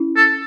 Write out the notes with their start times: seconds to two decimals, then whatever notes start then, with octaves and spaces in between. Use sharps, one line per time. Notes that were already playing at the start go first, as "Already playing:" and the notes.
Already playing: C#4 E4
0.16 A4